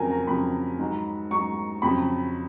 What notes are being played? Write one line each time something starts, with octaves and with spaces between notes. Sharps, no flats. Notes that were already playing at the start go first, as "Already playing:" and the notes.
Already playing: F2 C#3 F#3 A#4 G#5
A#5
F2 C#3 F#3 B5
G#2 F#3
G#2 F#3 C#6
F2 C#3 F#3 B5